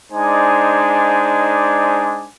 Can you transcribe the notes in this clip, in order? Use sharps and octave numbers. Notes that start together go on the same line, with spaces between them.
G#3 D4 D#4 C5 D5 G#5